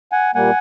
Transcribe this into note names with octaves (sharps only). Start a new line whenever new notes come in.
F#5 G#5
A#2 G3 A#3 F#5 G#5